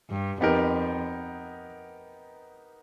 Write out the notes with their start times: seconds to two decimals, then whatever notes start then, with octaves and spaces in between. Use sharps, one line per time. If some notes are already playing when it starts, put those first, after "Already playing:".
0.10 G2
0.41 F2 B3 D#4 G4 A#4